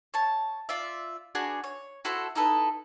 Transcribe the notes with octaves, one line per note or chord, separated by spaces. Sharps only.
C#5 A5
F4 D5 E5
D4 F#4 G#4 B4
C#5
E4 F#4 A4 C5
D#4 E4 A4 B4